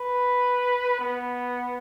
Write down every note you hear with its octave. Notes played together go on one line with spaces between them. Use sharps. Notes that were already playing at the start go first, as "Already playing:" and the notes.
Already playing: B4
B3